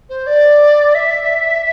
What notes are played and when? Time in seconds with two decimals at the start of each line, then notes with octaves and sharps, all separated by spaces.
0.09 C5
0.26 D5
0.94 E5